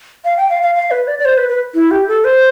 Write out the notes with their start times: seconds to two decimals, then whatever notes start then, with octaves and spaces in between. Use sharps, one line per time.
0.25 F5
0.37 G5
0.50 F5
0.63 F5
0.75 F5
0.91 B4
1.07 D5
1.19 D5
1.25 C5
1.37 B4
1.49 B4
1.74 E4
1.91 G4
2.08 A4
2.24 C5